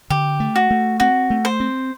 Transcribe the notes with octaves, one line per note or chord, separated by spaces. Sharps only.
D3 G4
A3
F#4
A3
C4 F#4
A3
C5
C4